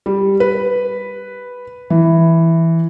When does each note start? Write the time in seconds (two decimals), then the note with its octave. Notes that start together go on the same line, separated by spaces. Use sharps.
0.06 G3
0.40 B4
1.90 E3